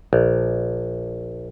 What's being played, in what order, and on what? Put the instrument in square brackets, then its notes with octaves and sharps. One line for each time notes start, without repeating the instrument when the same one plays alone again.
[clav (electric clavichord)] A#1